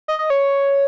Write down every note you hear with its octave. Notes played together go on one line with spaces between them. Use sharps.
D#5
D#5
C#5